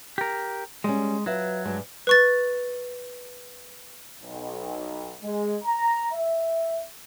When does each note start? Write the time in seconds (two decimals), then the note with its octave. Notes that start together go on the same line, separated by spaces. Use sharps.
0.18 G4 A#4
0.84 G3 G#3 C#4
1.26 F#3 F4 B4 E5
1.65 G2 G#3
2.07 B4 C#6 A6
4.22 B1
5.23 G#3
5.63 A#5
6.13 E5